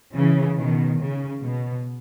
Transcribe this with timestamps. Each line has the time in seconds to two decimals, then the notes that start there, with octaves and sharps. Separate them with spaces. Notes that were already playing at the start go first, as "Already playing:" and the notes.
0.15 C#3 E3
0.58 B2 D#3
0.99 C#3
1.42 B2